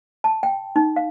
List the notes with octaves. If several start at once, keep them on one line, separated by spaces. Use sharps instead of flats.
A5
G5
D#4
F5